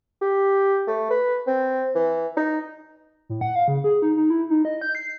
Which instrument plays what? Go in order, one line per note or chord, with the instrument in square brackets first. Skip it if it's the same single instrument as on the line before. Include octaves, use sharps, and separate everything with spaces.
[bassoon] G4
A3
B4
C4
E3
D#4
[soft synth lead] A2
F#5
F5
C#3
G#4
D#4
D#4
E4
D#4
D#5
G6
C7